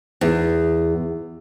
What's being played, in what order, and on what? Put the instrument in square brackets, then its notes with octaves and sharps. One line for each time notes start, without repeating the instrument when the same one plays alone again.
[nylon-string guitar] E2